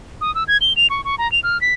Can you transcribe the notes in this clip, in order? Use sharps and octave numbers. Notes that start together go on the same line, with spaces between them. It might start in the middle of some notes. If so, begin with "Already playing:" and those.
D#6
E6
G#6
G7
F7
C#6
C#6
A#5
F7
F6
B6